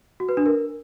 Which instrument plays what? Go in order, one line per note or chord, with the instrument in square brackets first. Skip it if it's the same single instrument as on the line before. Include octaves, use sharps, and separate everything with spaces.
[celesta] F#4
B4
D4
A#4